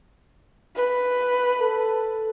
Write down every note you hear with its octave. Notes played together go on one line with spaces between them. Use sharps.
B4
A4